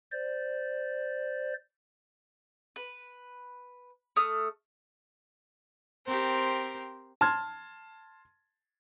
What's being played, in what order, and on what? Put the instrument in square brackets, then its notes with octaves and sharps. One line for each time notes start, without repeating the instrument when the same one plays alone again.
[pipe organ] C5 D5
[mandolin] B4
A3 D#6 F6
[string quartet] C4 G4 A#4 C5
[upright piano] A5 C6 F6 G#6